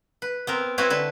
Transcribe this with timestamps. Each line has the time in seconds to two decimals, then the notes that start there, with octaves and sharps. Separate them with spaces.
0.22 B4
0.47 B3 C4 A#4
0.78 C4 E4 F#4 B4 C#5
0.90 D3 B4 A5